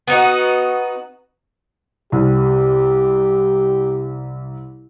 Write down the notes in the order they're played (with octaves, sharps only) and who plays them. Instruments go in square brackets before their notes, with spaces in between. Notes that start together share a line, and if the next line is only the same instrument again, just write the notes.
[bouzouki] B3 D#4 F#4
[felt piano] C2 [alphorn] G4